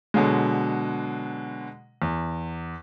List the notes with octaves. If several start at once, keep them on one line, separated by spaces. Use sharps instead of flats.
B2 D3 F#3 G#3
E2